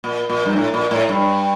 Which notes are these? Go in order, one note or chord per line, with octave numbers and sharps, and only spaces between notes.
A#2
A#2
G2
A2
A#2
A2
G2